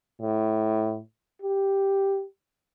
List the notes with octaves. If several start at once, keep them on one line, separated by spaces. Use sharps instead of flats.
A2
G4